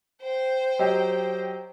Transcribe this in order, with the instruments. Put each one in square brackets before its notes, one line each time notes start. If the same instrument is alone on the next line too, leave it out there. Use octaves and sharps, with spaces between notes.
[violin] C5 G5
[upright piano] F#3 G4 D#5